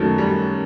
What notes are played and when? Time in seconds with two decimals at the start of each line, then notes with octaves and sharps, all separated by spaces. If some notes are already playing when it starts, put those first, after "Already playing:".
Already playing: F#2 D#3 F#3 A3
0.18 G3